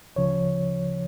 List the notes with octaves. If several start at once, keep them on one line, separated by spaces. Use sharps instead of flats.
D2 C#3 F3 C#5